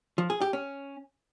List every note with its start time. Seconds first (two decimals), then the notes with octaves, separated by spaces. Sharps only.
0.18 F3
0.30 G#4
0.42 G4
0.53 C#4